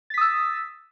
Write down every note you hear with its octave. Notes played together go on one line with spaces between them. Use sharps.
D#6 E6 A6 B6